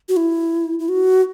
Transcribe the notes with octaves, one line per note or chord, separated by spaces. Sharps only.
F#4
E4
E4
F#4